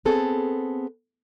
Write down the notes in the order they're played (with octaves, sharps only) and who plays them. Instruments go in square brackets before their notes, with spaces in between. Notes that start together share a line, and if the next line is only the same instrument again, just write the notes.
[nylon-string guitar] B3 C4 G#4 A4